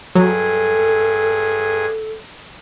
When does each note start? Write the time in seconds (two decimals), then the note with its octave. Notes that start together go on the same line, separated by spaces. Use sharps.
0.15 G2 F#3 G#4 A4